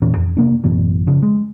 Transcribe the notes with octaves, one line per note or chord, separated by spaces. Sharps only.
E1 A#2 E3 C#4
F2
C3 A#3 D4
A1 F#2 B2 E3
C#3 F3
G#3